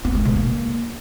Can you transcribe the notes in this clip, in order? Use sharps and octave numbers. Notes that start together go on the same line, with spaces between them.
B3
G#3
B2
A#3